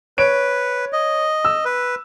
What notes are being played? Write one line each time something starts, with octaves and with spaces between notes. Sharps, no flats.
B4 C#5 D7
D#5
E6
B4